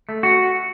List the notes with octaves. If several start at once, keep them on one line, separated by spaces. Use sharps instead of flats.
A3
F#4